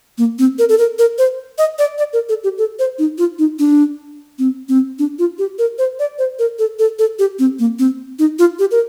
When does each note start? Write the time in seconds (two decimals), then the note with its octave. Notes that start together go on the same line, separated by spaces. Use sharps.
0.18 A#3
0.39 C4
0.59 A#4
0.69 A4
0.78 A#4
0.99 A#4
1.18 C5
1.58 D#5
1.79 D5
1.98 D5
2.13 A#4
2.29 A4
2.44 G4
2.58 A4
2.79 C5
2.99 D#4
3.18 F4
3.39 D#4
3.59 D4
4.39 C4
4.69 C4
4.99 D4
5.19 F4
5.39 G4
5.59 A#4
5.78 C5
5.99 D5
6.19 C5
6.39 A#4
6.59 A4
6.79 A4
6.99 A4
7.19 G4
7.39 C4
7.59 A#3
7.79 C4
8.19 D#4
8.39 F4
8.59 G4
8.71 A#4